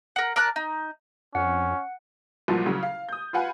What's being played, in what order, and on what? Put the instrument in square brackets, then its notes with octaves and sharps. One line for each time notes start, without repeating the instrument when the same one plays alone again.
[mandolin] A#4 F#5
A#4 D5 A5 F#6
D#4
[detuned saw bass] F2 [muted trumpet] C#4 [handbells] F#5
[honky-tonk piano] C2 A#2 F3 F#3
C#3 F#3
F5
D#6 G6
F4 B4 F5 F#5 G#5 B5